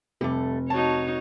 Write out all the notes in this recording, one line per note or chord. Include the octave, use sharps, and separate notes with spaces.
F1 G3 A3
D#4 F#4 C#5 A5